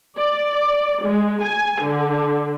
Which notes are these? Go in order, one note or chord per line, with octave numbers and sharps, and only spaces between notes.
D5
G#3
G#5
D3